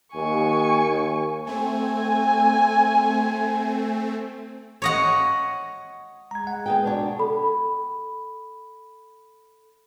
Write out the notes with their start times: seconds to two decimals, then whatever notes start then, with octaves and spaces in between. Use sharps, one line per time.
0.14 D#2 G#5 C#6
0.84 D#2
1.47 A3 C4 G#5
4.82 C#5 D#5 F#5
6.31 G#3 A#5 G#6
6.47 F#5
6.66 B3 G#4 G5
6.84 B2 D4 C#5
7.19 A4 B5